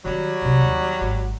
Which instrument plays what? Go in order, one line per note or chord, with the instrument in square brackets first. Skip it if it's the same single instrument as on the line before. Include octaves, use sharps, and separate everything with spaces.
[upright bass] D#3 C4 [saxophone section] F#3 G3
[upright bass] B1 C3
D#2
G#1